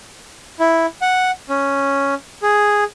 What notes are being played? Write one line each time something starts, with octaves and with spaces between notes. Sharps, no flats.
E4
F#5
C#4
G#4